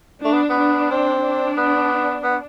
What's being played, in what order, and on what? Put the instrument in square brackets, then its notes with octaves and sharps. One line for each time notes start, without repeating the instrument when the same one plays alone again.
[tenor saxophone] A3 [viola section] D4
[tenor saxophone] B3
B3
[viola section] D4
[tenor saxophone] C4
[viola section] D4
[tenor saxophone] B3
B3